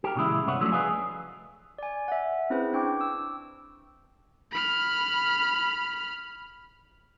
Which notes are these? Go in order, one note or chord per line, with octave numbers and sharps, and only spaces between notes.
G4 A#4
A#2 C#3 E3 G#3 E4
C2 G2 B3 C#5 F#5
F3 F#3 A3 C#4 D4
G#4 B4 D5 D#5 F5 G#5
D5 G#5
E5 F#5
C4 C#4 E4 G#4 B4 C5
D4 G5 C#6 D6
D6 E6
B5 F6